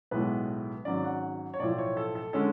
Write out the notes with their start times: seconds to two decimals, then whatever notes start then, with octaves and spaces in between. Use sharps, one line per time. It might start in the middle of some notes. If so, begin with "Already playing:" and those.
0.11 B1 A2 G#3 B3 B4
0.85 G#1 G#2 F#3 C#4 D5
1.04 F#5
1.54 C#5
1.60 B1 A2 F3 D5
1.78 C#5
1.97 A4
2.15 A4
2.33 D3 G#3 C#4 A4